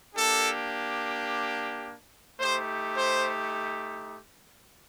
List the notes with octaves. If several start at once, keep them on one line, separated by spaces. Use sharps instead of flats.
A#3 D4 G4 A4
A3 D#4 G4 C5
C5